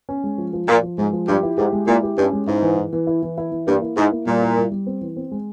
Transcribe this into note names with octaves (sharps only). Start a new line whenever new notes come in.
C#4
G#3
F3
F3
A#2 F3
F3
G#2 G#3
F3
G2 G4
E4
G#2 G4
G#3
A#2 E4
G4
G2 C#4
G#3
G#2 E4
E3
E3
E3
E4
E3
E4
E3
G2 A#3
E4
G#2 E4
A#3
A#2 G3
E4
G3
G3
C4
E3
C4
G#3